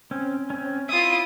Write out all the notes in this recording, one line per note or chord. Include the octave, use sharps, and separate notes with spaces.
C4 C#4
C4 C#4
E4 F4 E5 D#6